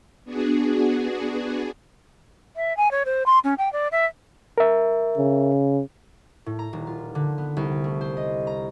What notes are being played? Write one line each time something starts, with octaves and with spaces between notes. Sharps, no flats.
B3 D4 F#4 G#4
E5
G#5
C#5
C5
C6
C#4
G5
D5
E5
A#4 E5
C#3
A2
A#5
D#1
F4
D3
B3
C2
A3
C5
D#5
A#5